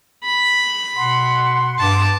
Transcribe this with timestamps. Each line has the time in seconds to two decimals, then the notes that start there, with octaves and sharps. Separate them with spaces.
0.24 B5
0.95 B2 F#5 C6
1.79 G2 A5 D6